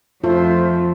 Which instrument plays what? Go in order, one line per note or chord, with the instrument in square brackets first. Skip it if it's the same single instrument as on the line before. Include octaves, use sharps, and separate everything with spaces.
[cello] F2 [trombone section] A3 C5 [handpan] F4